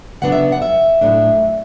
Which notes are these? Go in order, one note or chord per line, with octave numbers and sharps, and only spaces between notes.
C#3 F#3 B3 D4 F#5
E5
F#5
E5
A2 F#3 A3 D4